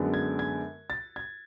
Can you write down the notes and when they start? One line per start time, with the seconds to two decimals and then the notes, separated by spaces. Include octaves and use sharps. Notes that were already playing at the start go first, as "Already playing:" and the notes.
Already playing: F#2 D3 G#3 B3
0.14 G#6
0.39 G#6
0.90 A6
1.16 G#6